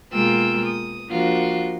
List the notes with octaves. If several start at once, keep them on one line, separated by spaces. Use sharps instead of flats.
B2 G#3 A#3 F4 G5 E6
D#6
F3 A#3 D4 F4 F#4